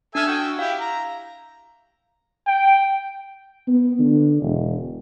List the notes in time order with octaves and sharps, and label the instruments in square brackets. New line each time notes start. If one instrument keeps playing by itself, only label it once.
[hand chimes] D4 F6 [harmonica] A4 E5 G#5
[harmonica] F#4 G5
[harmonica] E4 G4 [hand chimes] F5
[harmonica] A#5
[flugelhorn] G5
[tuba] B3
D3
E1